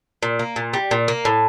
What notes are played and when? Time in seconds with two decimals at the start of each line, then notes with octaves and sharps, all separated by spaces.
0.23 A#2
0.39 A#3
0.56 A#2
0.74 G3
0.91 A#2
1.08 A#3
1.25 A2